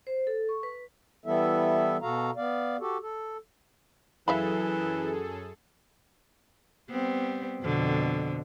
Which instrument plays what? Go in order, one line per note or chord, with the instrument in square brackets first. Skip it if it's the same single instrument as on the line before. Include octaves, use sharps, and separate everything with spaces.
[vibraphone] C5
A4
C#6
B4
[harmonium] E3 G3 B3 E4 A4 E5
B2 F#4 A4 F5 A#5
B3 D5 F5
F#4 G4 A4
A4
[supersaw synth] F#2 G#4 A4 [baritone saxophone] E3 [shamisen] E5 F5 B5
[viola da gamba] G3 B3 C4
F2 B2 D3